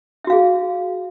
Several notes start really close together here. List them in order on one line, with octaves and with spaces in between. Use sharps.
E5 F#4 F5 G#4